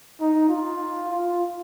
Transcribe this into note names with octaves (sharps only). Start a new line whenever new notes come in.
D#4
F4
F4